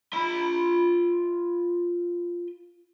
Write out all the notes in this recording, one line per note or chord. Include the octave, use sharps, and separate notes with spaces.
F4 B5